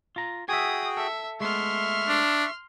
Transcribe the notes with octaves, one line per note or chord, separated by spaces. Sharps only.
F4 A#5
F#4 G#4 E5 G5 G#5 D#6
A4 E5
G#3 A3 B3 E5 C6 C#6 F6
D4